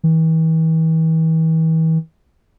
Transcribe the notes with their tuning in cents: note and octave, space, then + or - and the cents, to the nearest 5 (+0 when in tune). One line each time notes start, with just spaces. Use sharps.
E3 -40